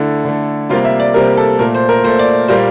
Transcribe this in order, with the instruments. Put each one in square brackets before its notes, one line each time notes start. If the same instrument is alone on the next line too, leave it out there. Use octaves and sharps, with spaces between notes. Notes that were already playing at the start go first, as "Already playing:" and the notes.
Already playing: [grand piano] D3 A3 E4
D3 A3
C3 G3 A#3 F4
E5
D5
C3 G3 A#3 A#4
A4
A#2 A3 A#4
C5
A#4
A#2 A3 C5
D5
A#2 G3 A#3 C5